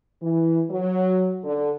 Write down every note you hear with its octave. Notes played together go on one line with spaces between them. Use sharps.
E3
F#3
D3